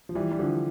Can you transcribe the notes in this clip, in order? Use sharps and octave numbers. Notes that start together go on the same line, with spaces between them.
F3
E3 G3
G3
D3 F3